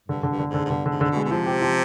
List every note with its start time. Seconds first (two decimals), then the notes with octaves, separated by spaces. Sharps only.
0.08 G2 D3
0.23 D3
0.29 G2
0.39 D3
0.49 G#2 D3
0.65 G#2
0.70 G2 D3
0.86 D3
0.91 G#2
1.01 G#2 D3
1.11 B2
1.16 G#3
1.24 B2
1.31 C3 F3
1.46 G4
1.62 F3